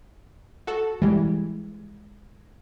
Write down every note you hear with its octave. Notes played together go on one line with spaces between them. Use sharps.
F#4 A4
E3 G3 G#3